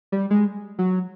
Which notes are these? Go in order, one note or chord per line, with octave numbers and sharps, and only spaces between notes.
G3
G#3
F#3